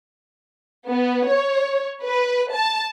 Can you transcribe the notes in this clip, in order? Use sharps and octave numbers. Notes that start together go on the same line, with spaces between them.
B3
C#5
B4
A5